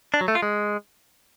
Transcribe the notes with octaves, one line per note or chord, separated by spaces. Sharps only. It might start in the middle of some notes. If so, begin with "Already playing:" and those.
D4
F#3
A3
F4
G#3